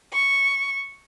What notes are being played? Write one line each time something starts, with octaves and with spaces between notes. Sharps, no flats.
C#6